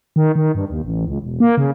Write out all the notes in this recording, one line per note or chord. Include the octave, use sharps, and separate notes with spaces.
D#3
D#3
G2
D#2
A1
C#2
E1
A#3
C#3